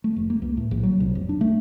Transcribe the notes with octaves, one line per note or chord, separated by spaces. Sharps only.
A3
F1
A#3
C#2
A2
A#1
F#3
C2
F1
D4
A3